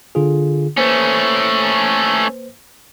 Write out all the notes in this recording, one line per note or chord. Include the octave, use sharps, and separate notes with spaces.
D3 F4 G#4
A3 A#3 C#4 B4 C5